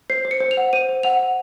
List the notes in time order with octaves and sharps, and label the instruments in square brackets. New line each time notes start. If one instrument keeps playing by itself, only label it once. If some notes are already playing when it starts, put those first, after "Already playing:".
[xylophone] C5 C7
C5
C#7
C5
F7
F#5
C5 D#7
C5
F#5 F7
F#5